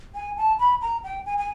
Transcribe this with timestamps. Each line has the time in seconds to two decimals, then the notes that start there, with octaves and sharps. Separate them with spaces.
0.15 G#5
0.37 A5
0.59 B5
0.81 A#5
1.04 G5
1.26 G#5
1.38 G#5